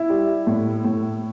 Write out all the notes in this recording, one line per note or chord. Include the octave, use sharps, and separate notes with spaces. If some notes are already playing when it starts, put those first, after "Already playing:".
Already playing: E4
G3
A2
A2